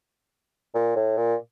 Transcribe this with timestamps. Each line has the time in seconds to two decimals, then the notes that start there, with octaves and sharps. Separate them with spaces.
0.74 A#2
0.96 A2
1.17 A#2